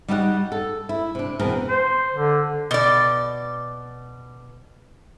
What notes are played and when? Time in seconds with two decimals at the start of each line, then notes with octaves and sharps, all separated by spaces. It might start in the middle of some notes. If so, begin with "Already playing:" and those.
0.08 G3 D#4 F#4 G4 D5 F#5
0.52 A4
0.89 E4
1.15 C3 D4
1.39 E2 B2 C4 A#4
1.69 C5
2.11 D3
2.71 B2 D5